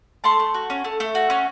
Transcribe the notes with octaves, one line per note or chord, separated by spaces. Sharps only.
A3 A5 C6
A3
F#4
C#4
A3
A3
F#4
C#4